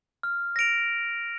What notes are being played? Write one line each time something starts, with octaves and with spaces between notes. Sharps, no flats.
F6
A#6 D7 F7